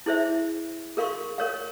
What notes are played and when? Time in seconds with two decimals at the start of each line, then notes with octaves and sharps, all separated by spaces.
0.06 E4 G#4 C5 E5
0.97 G#4 A#4 F5 C6 C#6
1.38 A#4 C#5 F5